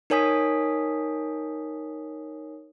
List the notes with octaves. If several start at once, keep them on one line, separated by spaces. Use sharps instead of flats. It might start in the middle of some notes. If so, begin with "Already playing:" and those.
D#4 A#4 C#5 G#5 D#6 B6